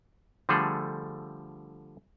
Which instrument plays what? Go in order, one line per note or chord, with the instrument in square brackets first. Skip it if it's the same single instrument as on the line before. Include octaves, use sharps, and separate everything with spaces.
[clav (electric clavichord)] D3 F3 G3 A3 G#4 A4